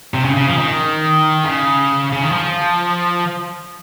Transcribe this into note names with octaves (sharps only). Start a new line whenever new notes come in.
C3
C#3
C#3
F3
D#3
C#3
C#3
D#3
F3